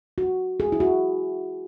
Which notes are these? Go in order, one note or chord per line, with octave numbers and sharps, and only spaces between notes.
F#4
G#4
E4
F#4